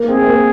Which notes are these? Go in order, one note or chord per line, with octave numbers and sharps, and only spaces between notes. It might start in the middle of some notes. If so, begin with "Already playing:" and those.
Already playing: A#3
C4 G#4
C4
A#3